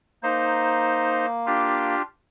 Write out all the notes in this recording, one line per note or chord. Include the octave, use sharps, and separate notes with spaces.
A#3 D#4 C5
D4 F4 G4